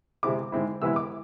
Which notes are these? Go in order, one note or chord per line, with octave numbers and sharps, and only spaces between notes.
C3 G#3 C4 E4 D6
G#2 G#3 C4 E4
C3 E3 G#3 B3 E4 E6
D6